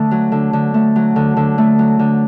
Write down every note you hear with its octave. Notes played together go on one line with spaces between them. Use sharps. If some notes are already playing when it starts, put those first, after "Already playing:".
Already playing: D3 A3
F#3
D3
D3
A3
F#3
D3
D3
A3
F#3
D3